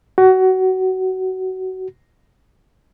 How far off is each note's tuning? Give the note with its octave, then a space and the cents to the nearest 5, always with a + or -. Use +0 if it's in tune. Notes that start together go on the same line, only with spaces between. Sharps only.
F#4 +20